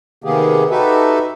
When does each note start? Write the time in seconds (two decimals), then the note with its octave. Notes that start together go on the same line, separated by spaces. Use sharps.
0.24 C3 D#3 A#3 B3 G4 G#4
0.70 D#4 F#4 G4 A4 B4 E5